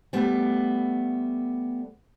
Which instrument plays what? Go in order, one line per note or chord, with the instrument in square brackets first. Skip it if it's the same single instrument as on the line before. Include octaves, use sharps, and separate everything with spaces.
[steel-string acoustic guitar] G3 A3 B3